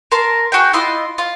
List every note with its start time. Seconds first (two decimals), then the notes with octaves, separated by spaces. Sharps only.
0.12 A#4 A5 C6
0.52 F#4 G#4 G5
0.73 E4 F4 D#5 C6
1.18 F4